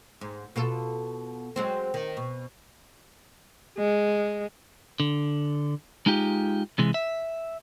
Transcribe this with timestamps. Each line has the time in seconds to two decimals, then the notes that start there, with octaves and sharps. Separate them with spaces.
0.21 G#2
0.56 B2 F4 A4
1.56 F#3 G#3 C4
1.94 D#3
2.17 B2
3.78 G#3
5.00 D3
6.06 G#3 D#4 F4 G4
6.78 C3 E3 G#3
6.94 E5